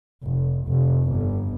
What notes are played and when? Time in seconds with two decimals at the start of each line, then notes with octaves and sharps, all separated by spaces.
0.23 F1
0.66 F1
1.05 G1